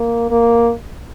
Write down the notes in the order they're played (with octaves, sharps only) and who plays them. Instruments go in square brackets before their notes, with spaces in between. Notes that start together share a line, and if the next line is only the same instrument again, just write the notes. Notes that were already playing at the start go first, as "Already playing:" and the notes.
Already playing: [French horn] A#3
A#3